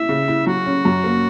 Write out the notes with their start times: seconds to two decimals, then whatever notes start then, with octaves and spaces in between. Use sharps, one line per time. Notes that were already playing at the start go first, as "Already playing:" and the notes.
Already playing: E4 E5
0.09 C#3
0.28 E4
0.47 F#3 F#4
0.66 C#4
0.85 F#2
1.04 A#3